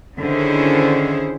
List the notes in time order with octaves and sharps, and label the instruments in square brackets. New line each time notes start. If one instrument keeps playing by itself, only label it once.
[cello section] D3 D#3 C#4 E4 G#4 C5